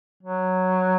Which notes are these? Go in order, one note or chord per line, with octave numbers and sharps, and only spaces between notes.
F#3